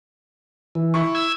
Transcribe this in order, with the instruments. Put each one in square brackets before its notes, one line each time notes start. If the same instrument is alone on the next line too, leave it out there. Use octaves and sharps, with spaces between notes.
[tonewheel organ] E3
[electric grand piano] E4 C#6
[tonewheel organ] E6 G#6